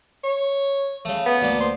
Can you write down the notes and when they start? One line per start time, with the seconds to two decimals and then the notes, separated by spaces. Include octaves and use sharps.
0.24 C#5
1.05 C#3 A3
1.26 B3
1.42 D2 A#3
1.60 C5